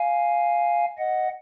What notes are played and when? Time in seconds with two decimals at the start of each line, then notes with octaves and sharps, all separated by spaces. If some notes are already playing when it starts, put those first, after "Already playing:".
Already playing: F5 G#5
0.98 D#5 F#5